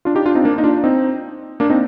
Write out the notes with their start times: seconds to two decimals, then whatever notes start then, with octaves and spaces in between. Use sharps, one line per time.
0.05 D4 F4
0.15 D#4 G4
0.25 D4 F4
0.35 C4 D#4
0.44 A#3 D4
0.58 D#4
0.64 D4 F4
0.84 C4 D#4
1.60 A#3 D4
1.70 C4 D#4